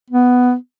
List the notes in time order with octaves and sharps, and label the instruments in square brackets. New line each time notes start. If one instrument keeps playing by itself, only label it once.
[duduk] B3